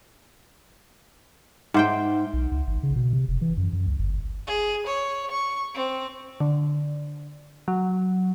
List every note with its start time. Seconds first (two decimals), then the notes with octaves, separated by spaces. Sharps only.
1.74 G#2 D#4 C5 E5 F#5 G5
2.33 B1
2.51 C#2
2.67 G#1
2.83 C#3
2.96 B2
3.13 C3
3.28 F1
3.41 E3
3.57 F#2
3.73 F#2
3.87 C#2
3.99 G1
4.47 G#4
4.87 C#5
5.31 C#6
5.75 C4
6.40 D3
7.68 F#3